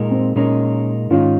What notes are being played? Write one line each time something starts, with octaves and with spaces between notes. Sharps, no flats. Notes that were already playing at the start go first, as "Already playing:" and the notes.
Already playing: A#2 G#3 D#4 A#4
C4
A#2 G#3 C#4 D#4 A#4
G#2 D#3 G#3 C#4 D#4 F4